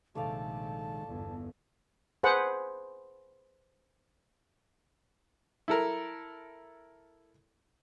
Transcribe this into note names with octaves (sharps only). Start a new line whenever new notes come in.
A#1 C3 D#3 G#3 A3 D5 F5 A5
G1 E2
G#4 B4 C5 F#5
E4 A4 A#4